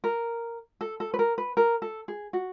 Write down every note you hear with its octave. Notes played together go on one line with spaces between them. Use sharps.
A#4
A4
A4
B4
A#4
B4
A#4
A4
G#4
F#4